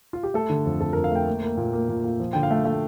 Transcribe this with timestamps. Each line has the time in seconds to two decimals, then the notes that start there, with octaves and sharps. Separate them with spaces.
0.13 F4
0.23 G4
0.34 A3 A4
0.50 D3
0.66 F2
0.80 F2 A4
0.93 A#4
0.96 F2
1.04 F5
1.12 A3 G5
1.28 A#3
1.42 A#3
1.57 A#2
1.73 A#3
1.88 A#2
2.04 A#2
2.20 F3
2.33 D3 G5
2.43 F5
2.51 A3
2.65 A3